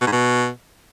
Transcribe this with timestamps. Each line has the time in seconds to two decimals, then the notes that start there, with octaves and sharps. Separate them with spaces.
0.01 B2
0.07 G#2
0.12 B2